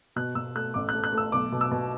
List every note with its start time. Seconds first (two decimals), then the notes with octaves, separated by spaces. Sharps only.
0.16 B2 F#6
0.35 B2 E6
0.55 A3 F#6
0.74 A1 D6
0.89 F#6
0.93 A3
1.04 F#6
1.13 A3 E6
1.32 B1 D6
1.52 B2
1.61 E6
1.71 B2